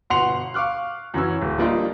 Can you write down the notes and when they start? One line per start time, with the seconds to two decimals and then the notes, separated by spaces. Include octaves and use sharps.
0.10 G1 B2 F#5 C6 C7 F7
0.54 F5 C#6 D6 F6 F#6
1.14 F#2 E3 F#3 C#4 E6
1.42 D1
1.58 F3 G3 A#3 D4 D#4 F4